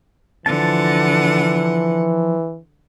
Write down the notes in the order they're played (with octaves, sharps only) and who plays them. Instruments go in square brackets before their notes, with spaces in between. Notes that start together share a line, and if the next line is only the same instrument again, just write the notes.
[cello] D3 F#5 [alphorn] E3 [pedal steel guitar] F3 A5